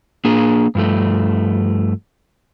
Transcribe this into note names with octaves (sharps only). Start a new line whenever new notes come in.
A#3 D4 G#4
G2 F3 A3